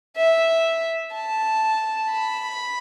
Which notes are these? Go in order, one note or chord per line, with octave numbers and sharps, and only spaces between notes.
E5
A5
B5